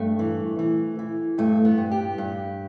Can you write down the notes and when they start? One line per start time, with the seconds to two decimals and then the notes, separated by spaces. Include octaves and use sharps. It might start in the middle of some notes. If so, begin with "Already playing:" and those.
Already playing: G2 A3
0.19 E3
0.59 E3
0.99 E3
1.38 G2 A3
1.65 B3
1.78 G2
1.92 G4
2.18 G2